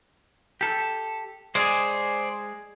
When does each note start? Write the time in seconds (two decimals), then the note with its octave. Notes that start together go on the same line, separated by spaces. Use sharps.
0.61 G4 A4
1.55 G#3 G#4 C5 D5